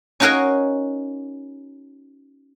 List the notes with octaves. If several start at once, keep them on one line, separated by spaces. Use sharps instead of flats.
C#4 D#4 F#4 A#4 F5 G#5